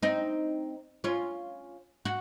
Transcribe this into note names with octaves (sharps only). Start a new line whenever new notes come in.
C4 D#4
C#4 F4
F#4